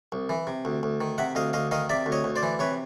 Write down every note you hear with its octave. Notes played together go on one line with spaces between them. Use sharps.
C2
E3
C3
D2
D2
D#3
C3 E5 F#5
D2 D#5 F5
D2 D#5 F5
D#3 D#5 F5
C3 D5 E5
D2
C#5 D#5
D2
C5 D5
E3
C3 B4 C#5